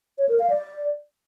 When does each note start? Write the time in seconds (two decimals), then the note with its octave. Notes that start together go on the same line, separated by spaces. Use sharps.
0.18 C#5
0.29 A#4
0.39 F5
0.50 D5